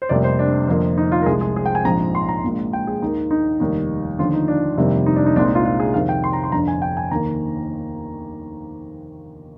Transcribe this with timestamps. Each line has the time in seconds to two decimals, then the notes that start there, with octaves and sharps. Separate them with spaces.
0.02 C5
0.09 F1 F2 C3 G3 A#3 D5
0.24 C5
0.39 D4
0.68 F2 D3 F3 A#3
0.98 D#4
1.12 F4
1.22 A#4
1.26 C2 C3 F3 G#3 G#4
1.41 G#4
1.56 G#4
1.66 G5
1.75 G#5
1.85 A#1 G#2 F3 C4 A#5
2.15 C6
2.29 A#5
2.44 A#1 A#2 G#3
2.73 G5
2.87 G#4
3.02 D#2 D#3 A#3 D#4
3.31 D#4
3.60 F1 D#2 D#3 G3 A#3 D#4
4.19 D#2 D3 F3 F4
4.34 D#4
4.48 D4
4.77 F2 C3 D#3 G3 A#3
5.06 D#4
5.16 D4
5.26 D#4
5.36 C2 A#2 G#3 C4 D4
5.45 D#4
5.55 F4
5.65 F4
5.80 G#4
5.94 F2 C3 D#3 F5
6.09 G5
6.24 C6
6.33 A#5
6.43 C6
6.52 G1 F2 D3 A#5
6.68 G#5
6.82 G5
6.97 G#5
7.11 D#2 D#3 A#3 A#5